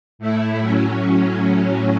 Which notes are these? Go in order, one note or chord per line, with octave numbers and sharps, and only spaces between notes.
A2 A3 E4
A2 F#3 C#4